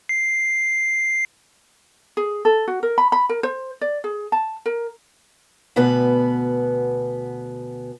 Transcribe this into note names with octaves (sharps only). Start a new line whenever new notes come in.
C7
G#4
A4
F#4
A#4
B5
B5
A#4
C5
D5
G#4
A5
A#4
D2 B2 B3 B4